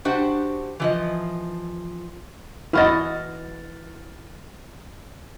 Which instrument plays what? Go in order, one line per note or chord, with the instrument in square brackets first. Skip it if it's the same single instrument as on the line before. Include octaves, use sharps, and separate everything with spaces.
[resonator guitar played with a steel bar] D4 F#4 G4 C5 F#5
E3 F3 D#5
[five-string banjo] E3 F#4 D#5 [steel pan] E4 [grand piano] F6 A6